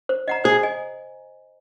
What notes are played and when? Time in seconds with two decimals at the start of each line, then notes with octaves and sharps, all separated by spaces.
0.09 C5
0.28 D#5 F#5 A#5
0.44 G#4 C5
0.63 D#5 G#5